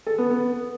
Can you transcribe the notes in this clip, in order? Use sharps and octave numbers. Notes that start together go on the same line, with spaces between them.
A4
B3
B3